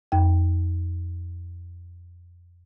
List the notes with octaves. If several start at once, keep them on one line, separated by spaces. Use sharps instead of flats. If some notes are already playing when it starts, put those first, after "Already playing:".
F2 G5